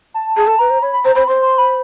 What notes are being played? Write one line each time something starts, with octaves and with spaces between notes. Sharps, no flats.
A5
G#4 A5
A4 A5
B4 A#5
C5
C#5 B5
B5
C5 A#5
C5 B5
C5 C6
C6
B5